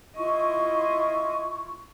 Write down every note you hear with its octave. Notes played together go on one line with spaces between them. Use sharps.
E4 F4 D#5 C#6